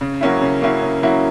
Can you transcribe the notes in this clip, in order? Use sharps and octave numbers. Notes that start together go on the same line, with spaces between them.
C#3
F#3 A#3 C#4 E4
C#3
F#3 A#3 C#4 E4
C#3
F#3 A#3 C#4 E4